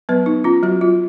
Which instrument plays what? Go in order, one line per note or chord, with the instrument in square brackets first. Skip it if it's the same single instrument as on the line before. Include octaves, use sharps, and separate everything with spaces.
[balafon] F#3 B3 B4
D#4
C#4 F4
F#3 F#4
F#3 F4